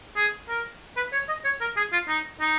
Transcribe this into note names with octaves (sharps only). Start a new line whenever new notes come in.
G#4
A#4
B4
C#5
D#5
C#5
A#4
G#4
F4
D#4
D#4